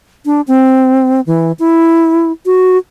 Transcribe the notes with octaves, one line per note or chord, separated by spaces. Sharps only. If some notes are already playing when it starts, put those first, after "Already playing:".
D4
C4
E3
E4
F#4